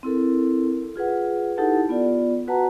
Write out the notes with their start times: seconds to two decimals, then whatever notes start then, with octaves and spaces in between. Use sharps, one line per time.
0.03 C4 E4 A4 A#4
0.96 F4 G#4 B4 F#5
1.57 D#4 E4 G4 A4 F#5 A5
1.89 B3 F4 D5
2.48 F#4 B4 F#5 A5 A#5